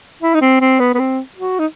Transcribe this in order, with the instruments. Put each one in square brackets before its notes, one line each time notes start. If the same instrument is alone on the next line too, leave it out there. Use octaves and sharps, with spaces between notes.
[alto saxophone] E4
D#4
C4
C4
B3
B3
C4
F#4
D#4